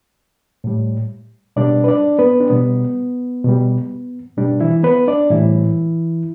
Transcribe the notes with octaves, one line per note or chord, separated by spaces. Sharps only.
A2 G3
B2 G3 D4 D5
B4
D4 D5
B3 B4
D4
B2 G3 B3
B2 G3
B2 G3 D4
E3 E4
B3 B4
D4 D5
A2 E3 G3 E4